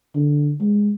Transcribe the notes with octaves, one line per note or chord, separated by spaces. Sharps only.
D3
G#3